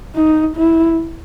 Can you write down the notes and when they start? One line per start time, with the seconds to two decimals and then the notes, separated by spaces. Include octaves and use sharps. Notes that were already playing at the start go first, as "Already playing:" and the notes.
0.16 D#4
0.56 E4